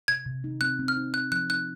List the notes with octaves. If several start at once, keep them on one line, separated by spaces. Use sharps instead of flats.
C3 G#6
C3
D#4
C4 F#6
C4
F6
D#4
D#4 F#6
F3 F#6
D#4 F#6